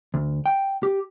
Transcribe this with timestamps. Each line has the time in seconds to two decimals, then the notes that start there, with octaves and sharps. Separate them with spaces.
0.14 D2
0.46 G5
0.83 G4